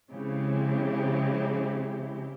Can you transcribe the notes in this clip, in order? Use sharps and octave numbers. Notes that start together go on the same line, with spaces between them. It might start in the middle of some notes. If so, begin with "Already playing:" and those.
C#3 F3 G#3 C4 E4 G4